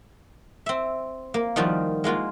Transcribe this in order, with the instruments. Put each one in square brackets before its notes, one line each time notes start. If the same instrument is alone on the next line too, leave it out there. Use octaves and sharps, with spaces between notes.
[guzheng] C4 E5
A#3
D#3 F3 G3 F4 F#4
G#3 A#3 F4 F#4